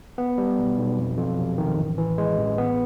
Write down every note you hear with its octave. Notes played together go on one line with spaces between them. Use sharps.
B3
G3
B1
B1
F2
F2
C3
D#3
A1
E3
G#3
A1
B3